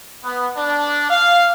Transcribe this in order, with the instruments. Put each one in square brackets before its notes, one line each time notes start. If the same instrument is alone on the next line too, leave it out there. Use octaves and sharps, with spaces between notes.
[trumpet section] B3
D4
F5